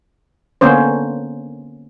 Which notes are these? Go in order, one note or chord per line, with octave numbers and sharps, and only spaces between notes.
D3 A#3 B3 C#4 C5